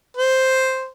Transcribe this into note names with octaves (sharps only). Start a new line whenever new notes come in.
C5